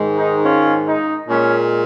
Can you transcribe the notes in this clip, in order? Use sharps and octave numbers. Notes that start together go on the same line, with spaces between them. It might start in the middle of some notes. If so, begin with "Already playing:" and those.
Already playing: G#2 D#3 G#3
D#4
C#4 F4
D#4
A#2 G#3 C#4